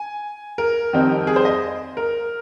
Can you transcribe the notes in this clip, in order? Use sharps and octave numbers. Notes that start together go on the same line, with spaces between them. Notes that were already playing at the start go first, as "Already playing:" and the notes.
Already playing: G#5
A#4
F2 D#3 G3 C4 D#4
G#4
C5
D#5
A#4